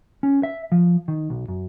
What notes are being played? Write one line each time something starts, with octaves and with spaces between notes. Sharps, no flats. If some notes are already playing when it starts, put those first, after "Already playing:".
C#4
E5
F3
D#3
B1
F#2